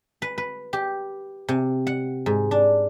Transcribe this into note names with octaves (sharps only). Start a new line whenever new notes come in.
B4
B4
G4
C3
F#5
G#2
D4